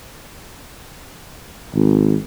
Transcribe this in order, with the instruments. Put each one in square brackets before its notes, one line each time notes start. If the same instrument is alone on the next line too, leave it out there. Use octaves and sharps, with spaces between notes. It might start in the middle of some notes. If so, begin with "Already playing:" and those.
[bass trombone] G#1